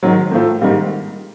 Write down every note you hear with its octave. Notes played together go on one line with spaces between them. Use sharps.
G#2 D#3 F#3
A2 F3 A3
G#2 D#3 G3 A#3